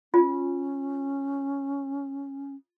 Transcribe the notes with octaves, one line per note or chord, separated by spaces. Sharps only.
C#4 F4